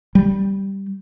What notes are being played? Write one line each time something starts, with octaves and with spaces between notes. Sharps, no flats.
G3